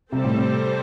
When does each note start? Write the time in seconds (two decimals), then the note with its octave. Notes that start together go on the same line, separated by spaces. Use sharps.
0.12 C3 G3 C4 A4 C5
0.24 A2
0.37 C3